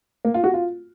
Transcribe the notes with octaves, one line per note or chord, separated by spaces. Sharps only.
A#3
F4
F#4
F4